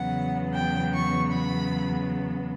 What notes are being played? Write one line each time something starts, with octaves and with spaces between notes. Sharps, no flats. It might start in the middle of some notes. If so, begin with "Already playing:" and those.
Already playing: E2 C#3 F#3 B3 F#5
G5
C#6
B5